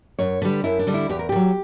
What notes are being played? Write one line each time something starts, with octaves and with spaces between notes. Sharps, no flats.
F#2 C#5
D3 G3 B4
F#2 E4
D4
D3 G3
E4
E2 G4
A#4
D3 G4
F#3